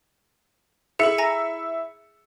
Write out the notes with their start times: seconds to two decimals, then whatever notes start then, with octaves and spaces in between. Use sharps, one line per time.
0.99 E4 G#4 A4 E5 C#7
1.18 G#5 A#5 A#6